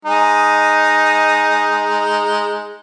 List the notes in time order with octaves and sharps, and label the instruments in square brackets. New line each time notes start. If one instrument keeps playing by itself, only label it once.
[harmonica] G#3 D#4